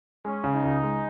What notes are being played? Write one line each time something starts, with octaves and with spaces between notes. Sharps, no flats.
G#3 C#4
C#3
D#4
C#2
G#3